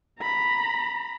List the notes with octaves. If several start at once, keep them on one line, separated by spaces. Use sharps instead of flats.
A#5 B5